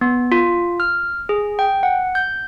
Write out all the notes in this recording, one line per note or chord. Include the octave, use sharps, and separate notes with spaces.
B3
F4
F6
G#4
G5
F#5
G6